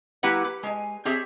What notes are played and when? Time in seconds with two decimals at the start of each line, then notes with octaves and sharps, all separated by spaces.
0.23 F#3 A#3 E4 G4 B4 F#5
0.44 B4
0.63 G#3 G#5
1.05 C4 G4 G#4 C#5 E5